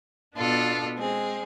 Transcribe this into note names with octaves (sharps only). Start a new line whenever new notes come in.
B2 B3 D4 F4 A4
G#3 C4 G#4